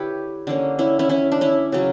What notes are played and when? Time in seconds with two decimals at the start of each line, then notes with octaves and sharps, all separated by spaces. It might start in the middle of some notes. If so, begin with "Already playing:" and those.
Already playing: D3 E4 G4 B4 C#5
0.47 D3 A#3 C#4
0.79 C#4 E4
0.99 C#4 E4
1.09 C#4 E4
1.32 D4
1.41 C#4 E4
1.72 C#3 F#3 C#4